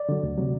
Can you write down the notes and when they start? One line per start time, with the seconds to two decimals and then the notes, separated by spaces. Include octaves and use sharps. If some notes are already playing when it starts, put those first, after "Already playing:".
Already playing: D5
0.09 D3 F#3
0.23 D2
0.38 C3 F#3